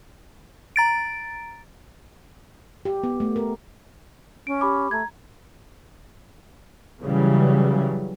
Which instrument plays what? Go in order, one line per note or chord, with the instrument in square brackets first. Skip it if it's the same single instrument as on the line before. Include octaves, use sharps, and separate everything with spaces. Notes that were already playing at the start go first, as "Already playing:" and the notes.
[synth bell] A#5 A6 D7
[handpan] G4
B3
A3
A#4
[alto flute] C#4 [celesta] D7
[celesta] G4 B5 D6
[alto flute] A3 [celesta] A#5 G#6
[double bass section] C#3 E3 F#3 G3